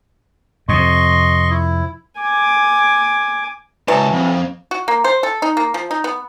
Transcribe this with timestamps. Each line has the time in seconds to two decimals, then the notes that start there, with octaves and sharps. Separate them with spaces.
0.69 F2 C3 D#5 C6 C#6
1.50 E4
2.19 G#5 D6
3.88 C#2 E3 F#3 A5
4.12 F2
4.71 F#4
4.88 A#3
5.04 C5
5.23 A4
5.42 D#4
5.57 A#3
5.74 F3
5.91 D#4
6.04 B3